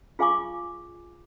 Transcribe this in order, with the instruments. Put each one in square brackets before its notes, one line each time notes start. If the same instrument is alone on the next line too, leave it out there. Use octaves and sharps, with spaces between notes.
[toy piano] F4 G#4 F5 G#5 C#6 D6